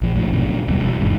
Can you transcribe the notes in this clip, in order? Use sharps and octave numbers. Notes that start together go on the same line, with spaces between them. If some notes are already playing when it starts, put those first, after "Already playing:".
A#1 F3
F#2 A2 F3
F#2 B2 D3
D#1 B2 D3 G3
E1
G1 E2 G#2